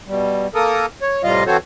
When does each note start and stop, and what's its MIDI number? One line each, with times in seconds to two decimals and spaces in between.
0.08 0.47 47
0.08 0.47 55
0.55 0.86 58
0.55 0.86 69
0.55 0.86 70
0.55 0.86 87
1.02 1.22 73
1.24 1.44 45
1.24 1.44 48
1.24 1.44 55
1.24 1.44 65
1.24 1.44 75
1.24 1.44 77
1.47 1.57 52
1.47 1.57 60
1.47 1.57 66
1.47 1.57 69
1.47 1.57 72
1.47 1.57 73